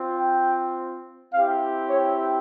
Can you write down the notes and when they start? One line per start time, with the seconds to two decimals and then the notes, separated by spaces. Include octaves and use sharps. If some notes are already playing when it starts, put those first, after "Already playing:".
Already playing: C4 F4
0.21 G5
1.34 C4 E4 G4 F5
1.90 C#5